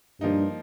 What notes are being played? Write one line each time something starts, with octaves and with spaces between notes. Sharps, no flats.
G2 F3 A#3 D#4